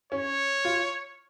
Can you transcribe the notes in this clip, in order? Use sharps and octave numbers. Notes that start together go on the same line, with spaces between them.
C#4 C#5
F4